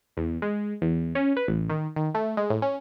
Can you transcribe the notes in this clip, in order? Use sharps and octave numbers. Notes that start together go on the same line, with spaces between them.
E2
G#3
E2
C#4
B4
A1
D#3
D#3
A3
G#3
A2
C#4